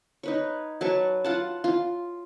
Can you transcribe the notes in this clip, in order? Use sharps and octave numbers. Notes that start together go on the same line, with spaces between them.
D#4 B4 C#5
F#3 B4 A5 C#6
F4 F#5 A5
F4